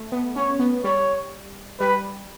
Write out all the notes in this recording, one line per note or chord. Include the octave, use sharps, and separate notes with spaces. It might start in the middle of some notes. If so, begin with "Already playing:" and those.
Already playing: A3
B3
C#4 C#5
B3
G3 C#5
G3 B4